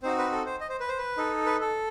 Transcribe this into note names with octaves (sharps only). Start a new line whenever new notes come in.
C4 D#4 F#4 C5
B4
A4
C5
D#5
C5
B4
C5
B4
D#4 A4
B4
A4